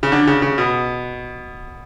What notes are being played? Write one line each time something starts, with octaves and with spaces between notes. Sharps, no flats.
C#3
D3
C#3
C#3
B2